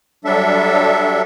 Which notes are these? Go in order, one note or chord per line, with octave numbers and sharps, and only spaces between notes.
F#3 G3 D4 A4 E5